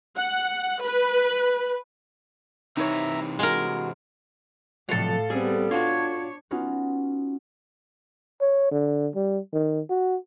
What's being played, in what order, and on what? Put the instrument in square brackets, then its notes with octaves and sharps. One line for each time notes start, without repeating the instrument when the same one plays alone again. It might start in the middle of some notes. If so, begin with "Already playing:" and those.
[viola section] F#5
B4
[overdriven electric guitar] C3 E3 [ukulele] D#4 C#5 [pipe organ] E5 A#5
[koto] G#3 A#4 [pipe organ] F#4
[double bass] A2 [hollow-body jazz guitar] C3 F3 F#3 [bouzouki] A4 F5
[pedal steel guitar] G3 [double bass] B3 C4 [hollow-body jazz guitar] G#4
[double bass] D4 [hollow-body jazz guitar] F4 F#4 [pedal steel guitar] C#5
[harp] B3 C#4 D#4 F4 F#4
[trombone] C#5
D3
G3
D#3
F#4